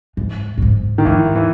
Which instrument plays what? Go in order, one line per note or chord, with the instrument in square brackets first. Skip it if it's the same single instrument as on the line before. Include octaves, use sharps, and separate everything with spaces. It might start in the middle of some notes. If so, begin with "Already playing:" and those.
[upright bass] G#2
G2
G#2
[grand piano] D#3
[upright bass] G#2 [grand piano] E3
[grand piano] E3